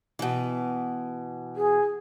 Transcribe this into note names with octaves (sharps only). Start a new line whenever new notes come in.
B2 E3
G#4